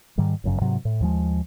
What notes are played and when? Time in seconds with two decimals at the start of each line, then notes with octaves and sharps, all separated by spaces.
0.18 G#2 D#3 G3
0.44 G1 F#2 C#3
0.61 G#2 C3 F#3
0.85 A2
1.00 D#2 F3 G#3